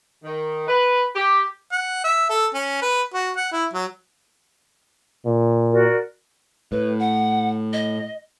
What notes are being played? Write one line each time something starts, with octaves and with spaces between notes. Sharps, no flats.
D#3
B4
G4
F#5
E5
A4
C#4
B4
F#4
F#5
E4
F#3
A#2
F#4 A#4 D5
A2 B4
F#5
D#5